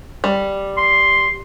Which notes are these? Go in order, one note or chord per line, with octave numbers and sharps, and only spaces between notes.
G3
C6